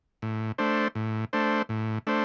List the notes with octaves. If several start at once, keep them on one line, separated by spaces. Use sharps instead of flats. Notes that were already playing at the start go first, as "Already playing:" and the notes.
A2
A3 D4 C5
A2
A3 D4 C5
A2
A3 D4 C5